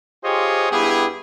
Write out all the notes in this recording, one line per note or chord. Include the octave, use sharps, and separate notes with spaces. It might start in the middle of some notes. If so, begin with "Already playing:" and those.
F4 G4 G#4 C5 C#5 D#5
G2 B3 E4 G4 G#4